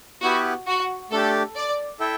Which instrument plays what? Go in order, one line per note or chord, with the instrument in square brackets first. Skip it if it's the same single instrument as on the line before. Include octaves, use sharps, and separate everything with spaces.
[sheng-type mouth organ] B3 E4 G4 B4 [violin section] F#4
[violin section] F#4
[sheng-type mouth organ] A3 D4 G4 [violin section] A4
[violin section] D5
[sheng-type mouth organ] E4 A4 E5 G5